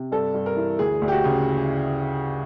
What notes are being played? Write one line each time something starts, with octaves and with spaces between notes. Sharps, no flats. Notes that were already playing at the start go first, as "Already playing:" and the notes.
Already playing: C3
G2 A4
G2
A#4
E3
D2 G#4
D2
G4
F#4
C#3